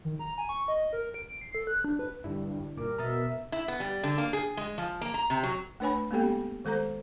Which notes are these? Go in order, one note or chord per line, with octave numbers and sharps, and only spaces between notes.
D#3
A#5
G#5
C#6
D#5
A#4
D7
C7
A4
F#6
D4
B4
G2 D3 D4 E4
G2 A#2 A#4 D6
B2 E5 A#5 D#6 A6
E4
B3
G3
D3
A#3
G#4
G#3
F3
A#3
A#5
C3
F#3
A3 D4 B4 C#5 G#5 B5
G#3 A#3 B3 G4 A4 G5
C#4
D#3 G#3 A4 C5 A#5